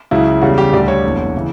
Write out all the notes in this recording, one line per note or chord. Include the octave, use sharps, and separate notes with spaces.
C#2 C#3 F#3 E4
E2 C#3 G3 F#4
G4
D2 D3 G3 D5
C#5
F#1 E2 D3
C#3 E3